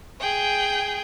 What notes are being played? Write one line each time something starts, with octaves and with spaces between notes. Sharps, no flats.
G#4 G5